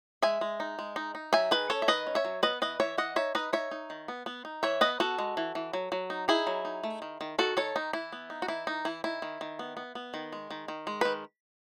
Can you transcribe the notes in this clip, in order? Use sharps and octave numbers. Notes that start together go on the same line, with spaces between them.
G#3 E5 G#5
G#3
D#4
G#3
D#4
D#4
F#3 E5 G#5
D#3 G#4 B4
C#4 A4 C#5
E5
D#3 B4 D#5
C#4
C#5 E5
F#3
B3 B4 D#5
E3 B4 D#5
E3 C#5 E5
E3 D#5 F#5
D#4 C#5 E5
D#4 B4 D#5
D#4 C#5 E5
D#4
D#3
B3
B3
D#4
E3 C#5 E5
B3 B4 D#5
B3 F#4 A4
G#3
E3
E3
F#3
F#3
D#4
D#4 E4 G#4
F#3
D#4
A3
D#3
D#3
D#3 F#4 A4
D#3 A4 C#5
D#3 D#4
E3 E4
B3
D#4
F#4
E3 E4
E3 D#4
E3 E4
D#3 E4
D#3
D#3
B3
B3
B3
D#3
G#3
D#3
D#3
G#3
D#3 B4